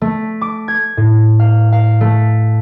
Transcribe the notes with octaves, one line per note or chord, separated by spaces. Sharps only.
A3
D6
G#6
A2
F5
F5
A3